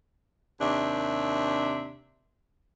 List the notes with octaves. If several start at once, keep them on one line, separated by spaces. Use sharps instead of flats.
D#2 C3 D4 E5